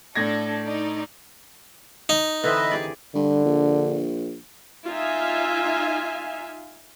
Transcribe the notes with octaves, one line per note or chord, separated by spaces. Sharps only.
A2 D4 A4 G#6 A#6
D#4 D5
D#4
D3 E3 C4 B4 D#5 E5
G4 G#4 D5
G2 D3
A#1
D#4 F4 E5 F5 G#5